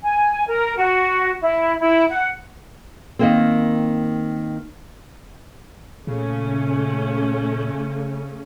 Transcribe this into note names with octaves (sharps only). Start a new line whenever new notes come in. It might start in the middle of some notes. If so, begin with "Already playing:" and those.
G#5
A#4
F#4
E4
E4
F#5
D#3 A#3 C4
A#2 C#3 A3 C#4